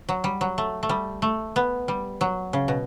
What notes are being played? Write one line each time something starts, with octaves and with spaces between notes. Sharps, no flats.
F#3
G3
F#3
A3
A3
G3
A3
B3
G3
F#3
C#3
B2